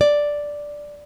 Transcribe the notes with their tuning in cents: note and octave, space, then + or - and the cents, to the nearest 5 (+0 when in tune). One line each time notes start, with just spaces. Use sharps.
D5 +0